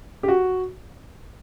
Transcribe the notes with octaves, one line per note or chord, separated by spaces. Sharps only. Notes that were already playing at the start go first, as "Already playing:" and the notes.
G4
F#4